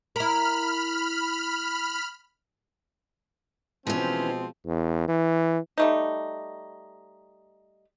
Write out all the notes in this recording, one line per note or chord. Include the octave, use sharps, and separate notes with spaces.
E4 A#4 B5 F6
B2 E3 F3 G#3 C4 C#4
E2
E3
G3 A3 D#4